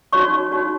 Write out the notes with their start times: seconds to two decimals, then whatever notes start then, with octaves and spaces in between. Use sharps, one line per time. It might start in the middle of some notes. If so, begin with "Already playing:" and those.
0.13 D#4 F#4 C#5 C#6
0.52 D#4 F#4 C#5